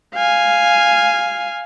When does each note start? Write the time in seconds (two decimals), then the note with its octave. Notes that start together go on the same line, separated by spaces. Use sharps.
0.15 F5 G#5